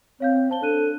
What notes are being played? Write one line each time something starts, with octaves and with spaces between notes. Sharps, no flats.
C4 C#5 F5 G6
C5 A5 G7
D4 A4 F#6 D#7